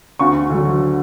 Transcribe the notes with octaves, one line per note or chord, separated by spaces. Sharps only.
D2 C#6
D3 F#3